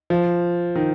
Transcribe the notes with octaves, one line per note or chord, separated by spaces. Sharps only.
F3
D#3